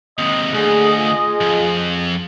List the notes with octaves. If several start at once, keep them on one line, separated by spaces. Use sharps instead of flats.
D#2 C3 D#5
D2 D3 G#4
F4 G#4
F2